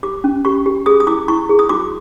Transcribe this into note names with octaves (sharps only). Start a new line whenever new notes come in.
G4 D6
C#4
G4 C#6
G4
G#4 D#6
D#6
E4 D6
E4 C#6
G#4
D#6
F#4 D6